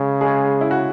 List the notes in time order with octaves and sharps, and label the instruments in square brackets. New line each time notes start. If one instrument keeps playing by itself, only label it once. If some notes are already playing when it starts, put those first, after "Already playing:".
Already playing: [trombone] C#3 [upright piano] G#3
[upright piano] G#3 G#4
E4
F#4